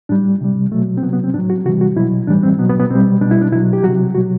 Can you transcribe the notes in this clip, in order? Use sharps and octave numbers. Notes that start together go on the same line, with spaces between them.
A2 G3 D4
C3 G3
B2 F#3 A3
C4
C3 F#3 B3
B3
C4
A2 F#3 D4
F#4
C3 E3 G3 F#4
F#4
B2 F#3 E4
A2 E3 G3 D4
C4
B2 F#3 B3
B3
B3
B2 G3 C4
B2 G3 D4
E4
D4
B2 F#3 E4
G4
C3 F#3 F#4
B2 F#3 F#4